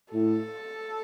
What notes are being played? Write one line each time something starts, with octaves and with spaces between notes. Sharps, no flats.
A2 A4